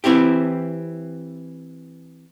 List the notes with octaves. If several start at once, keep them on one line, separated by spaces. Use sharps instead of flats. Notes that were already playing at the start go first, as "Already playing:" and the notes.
E3 C4 E4 G4